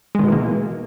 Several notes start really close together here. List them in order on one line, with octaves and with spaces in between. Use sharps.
G#3 D#3 B2 E3 A#3